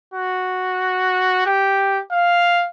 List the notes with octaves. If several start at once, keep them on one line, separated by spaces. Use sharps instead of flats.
F#4
G4
F5